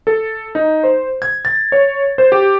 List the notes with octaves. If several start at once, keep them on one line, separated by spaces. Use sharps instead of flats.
A4
D#4
C5
G#6
A6
C#5
C5
G4